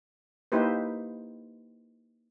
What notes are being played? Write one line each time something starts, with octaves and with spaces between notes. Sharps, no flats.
A#3 D#4 E4 G4 B4 C5